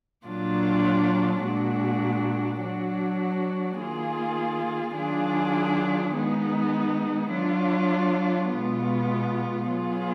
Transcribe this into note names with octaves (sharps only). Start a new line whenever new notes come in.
A#2 F#3 D4 F4
A#2 G#3 D4 F#4
F#3 D4 F#4
D#3 A#3 F4 G#4
D#3 F#3 D4 F4 G#4
D#3 G#3 B3 D#4
F#3 D4 F4
B2 G#3 B3 F4
F#3 B3 F4 G#4